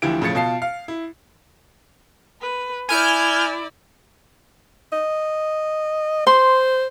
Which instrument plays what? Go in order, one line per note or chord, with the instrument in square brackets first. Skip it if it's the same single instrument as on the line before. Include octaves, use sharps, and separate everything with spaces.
[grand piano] D2 E3 F3 E4 G4 D7
E1 A2 C#3 F3 A6 C#7
B2 F4 A5 C7
F5
E4
[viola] B4
[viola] E4 D5 [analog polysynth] G#5 F6 G6
[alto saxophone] D#5
[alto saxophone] C5 [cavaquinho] C6